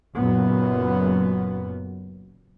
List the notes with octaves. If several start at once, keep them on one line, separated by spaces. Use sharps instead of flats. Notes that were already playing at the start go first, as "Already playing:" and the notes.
F#1 F#2 A#2 B3